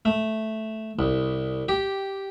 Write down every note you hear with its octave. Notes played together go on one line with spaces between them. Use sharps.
A3
C2
G4